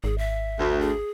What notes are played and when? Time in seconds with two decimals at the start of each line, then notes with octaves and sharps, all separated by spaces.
0.04 G#1 G#4
0.18 E5
0.59 D2
0.81 G#4